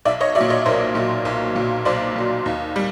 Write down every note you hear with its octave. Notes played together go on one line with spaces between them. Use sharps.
B1 D5 E5
C#5 D#5
F#3 D5 E5
A#2
C#5 D#5
B1 A#4 C5
A#2 F#3
B1
A#2 F#3
B1 C5 D5
A#2 F#3
D#2
G3